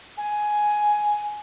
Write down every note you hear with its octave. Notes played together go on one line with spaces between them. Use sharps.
G#5